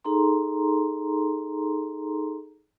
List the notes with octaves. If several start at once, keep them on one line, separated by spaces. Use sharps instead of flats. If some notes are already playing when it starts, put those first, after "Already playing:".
D#4 G#4 A4 A#5 C6